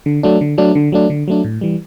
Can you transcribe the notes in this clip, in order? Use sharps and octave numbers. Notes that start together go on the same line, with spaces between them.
D3
F#3 A3 D4
D3
F#3 A3 D4
D3
F#3 A3 D4
D3
F#3 A3 D4
A2
E3 G3